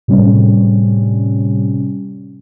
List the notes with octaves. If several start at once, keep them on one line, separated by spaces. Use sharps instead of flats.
A2 C3 G3 C#4